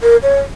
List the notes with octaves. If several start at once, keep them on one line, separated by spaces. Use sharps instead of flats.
A#4
C#5